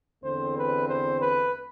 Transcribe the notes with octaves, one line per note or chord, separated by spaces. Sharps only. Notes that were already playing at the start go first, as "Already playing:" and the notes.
E2 D3 A3 C4 C5
B4
C5
B4